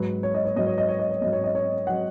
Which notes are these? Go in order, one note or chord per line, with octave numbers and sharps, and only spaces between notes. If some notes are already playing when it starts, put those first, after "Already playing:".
Already playing: G#2 F#3 B4
C#5
D#5
C#5
G#2 F#3 D#5
C#5
D#5
C#5
D#5
C#5
G#2 F#3 D#5
C#5
D#5
C#5
F#3 F#5